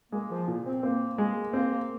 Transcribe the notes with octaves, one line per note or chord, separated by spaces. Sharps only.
G#3 A#3
F3
A#2
C4
A#3 C4
G#3
A#3 C4
A#3